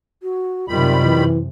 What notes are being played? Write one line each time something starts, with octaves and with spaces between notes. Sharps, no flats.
F#4
F#2 C3 D#3 G3 F4 B5
E3